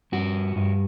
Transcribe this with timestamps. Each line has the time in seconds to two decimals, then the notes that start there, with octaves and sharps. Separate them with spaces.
0.12 G2 F#4
0.56 G2